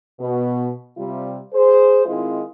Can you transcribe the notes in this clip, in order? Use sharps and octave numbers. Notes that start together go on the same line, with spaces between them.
B2
C3 G3 F4
G#4 C5
D#3 G#3 C4 E4 F4